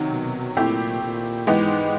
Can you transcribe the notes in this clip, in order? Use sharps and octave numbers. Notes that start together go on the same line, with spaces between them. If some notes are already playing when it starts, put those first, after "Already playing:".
Already playing: C3 D#3 F#3
B2
A#2 A3 C4 E4 G4
A#2
G#2 E3 G#3 B3 D#4 G4